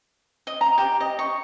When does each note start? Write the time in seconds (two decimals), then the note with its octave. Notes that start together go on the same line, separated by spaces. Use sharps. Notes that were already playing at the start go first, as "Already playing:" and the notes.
0.47 D#5
0.61 A#5
0.78 G4
1.00 D#5
1.19 C#6